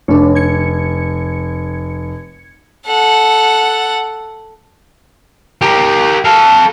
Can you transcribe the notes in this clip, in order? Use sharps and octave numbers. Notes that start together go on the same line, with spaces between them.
F1 D4 C#5
G#6 C#7
A4 F#5
G4 A#4
A4 F5